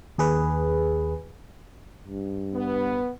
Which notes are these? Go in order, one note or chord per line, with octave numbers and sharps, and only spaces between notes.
D#2 G#4 B4
G2
B3